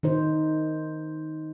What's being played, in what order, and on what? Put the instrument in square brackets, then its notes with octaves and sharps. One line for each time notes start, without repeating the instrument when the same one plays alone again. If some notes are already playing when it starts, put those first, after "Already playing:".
[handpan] D#3 D#4 C5